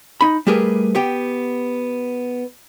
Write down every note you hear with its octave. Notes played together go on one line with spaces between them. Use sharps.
D#4 B5
G3 A3 G4 G#4 A#4 B4
B3 G4 G5